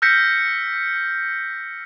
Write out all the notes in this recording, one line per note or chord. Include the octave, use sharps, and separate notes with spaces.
E6 F6 G6 A#6 B6 C#7